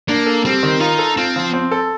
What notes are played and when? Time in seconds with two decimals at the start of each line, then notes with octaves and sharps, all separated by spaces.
0.08 A#3 D4
0.26 A4
0.45 G3 C4
0.63 D#3
0.80 D#4 F4
0.99 A4
1.17 C4 F4
1.36 F3
1.53 C4
1.71 A4